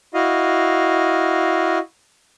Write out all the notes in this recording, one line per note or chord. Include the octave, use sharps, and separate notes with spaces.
E4 F#4 D#5 F5